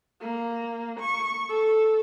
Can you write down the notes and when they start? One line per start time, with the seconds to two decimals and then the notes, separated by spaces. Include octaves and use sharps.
0.21 A#3
1.00 C#6
1.49 A4